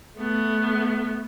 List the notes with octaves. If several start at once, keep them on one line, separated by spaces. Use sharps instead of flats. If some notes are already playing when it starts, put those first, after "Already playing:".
A3 B3